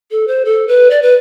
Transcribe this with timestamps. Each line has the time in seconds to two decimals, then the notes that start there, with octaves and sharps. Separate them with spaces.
0.11 A4
0.28 C5
0.45 A4
0.68 B4
0.90 D5
1.02 B4